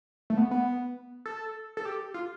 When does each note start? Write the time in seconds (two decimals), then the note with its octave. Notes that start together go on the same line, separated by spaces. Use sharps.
0.30 A3
0.37 B3
0.51 B3
1.26 A4
1.77 A4
1.85 G4
2.14 F4